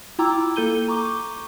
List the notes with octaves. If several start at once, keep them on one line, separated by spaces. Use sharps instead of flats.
E4 F4 G5 A#5 D6 E6
A#3 A4 G6 D#7 G7
A#5 C#6 D6